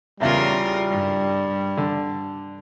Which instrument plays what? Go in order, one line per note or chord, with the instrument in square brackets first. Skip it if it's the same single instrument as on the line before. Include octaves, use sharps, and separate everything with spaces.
[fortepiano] A1 E2 F5 [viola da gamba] C#3 F4 A#4 [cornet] G3
[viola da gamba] G2
[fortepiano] D3